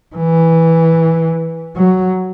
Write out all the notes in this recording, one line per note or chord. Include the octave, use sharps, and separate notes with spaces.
E3
F#3